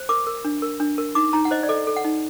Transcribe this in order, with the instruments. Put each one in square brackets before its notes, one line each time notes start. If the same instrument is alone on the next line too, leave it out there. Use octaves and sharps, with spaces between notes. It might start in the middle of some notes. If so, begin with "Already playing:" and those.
Already playing: [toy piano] C5
A#4 D6
A#4
D4
A#4
D4
A#4
D#4 D6
D#4 A#5
F#5
C5 D#5
D5
A4 D#5
A4
F#5
D#4